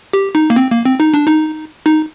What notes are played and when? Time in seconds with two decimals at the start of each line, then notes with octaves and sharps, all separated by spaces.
0.13 G4
0.35 D#4
0.50 A#3
0.56 C4
0.71 A#3
0.85 C4
1.00 D#4
1.14 D4
1.27 D#4
1.86 D#4